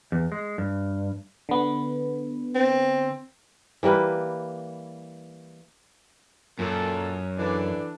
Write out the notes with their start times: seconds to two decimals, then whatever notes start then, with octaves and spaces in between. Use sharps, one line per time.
0.12 E2
0.32 G#3
0.58 G2
1.49 D3 B3
2.55 C4
3.83 E3 G3 A#3 B4
6.59 F#2 A#2 A4
7.38 D3 E3 D4